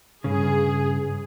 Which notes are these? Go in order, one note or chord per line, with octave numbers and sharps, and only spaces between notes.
G2 C#3 G#4